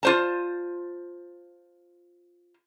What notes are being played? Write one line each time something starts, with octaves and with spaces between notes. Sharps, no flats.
F4 C5 A5